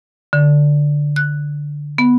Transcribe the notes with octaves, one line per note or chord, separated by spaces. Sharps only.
D3
F#6
B3